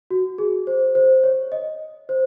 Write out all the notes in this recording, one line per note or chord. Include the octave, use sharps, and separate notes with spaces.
F#4
G#4
C5
C5
C#5
D#5
C5